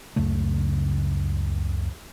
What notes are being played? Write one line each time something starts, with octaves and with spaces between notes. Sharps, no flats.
C#2 F#2 C#3 A3